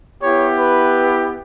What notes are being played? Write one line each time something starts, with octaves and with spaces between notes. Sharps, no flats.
B3 E4 G4 C#5
B4